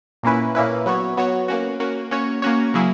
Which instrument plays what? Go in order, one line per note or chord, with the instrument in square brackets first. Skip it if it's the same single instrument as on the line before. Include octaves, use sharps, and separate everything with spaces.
[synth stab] A#2 A#3 C#4 E4 B4
A#2 A#3 C#4 E4 B4
F#3 B3 F#4 C#5
F#3 B3 F#4 C#5
A#3 C#4 F#4
A#3 C#4 F#4
A#3 C#4 F#4 C#5
A#3 C#4 F#4 C#5
C#3 F#3 A#3 E4 G#4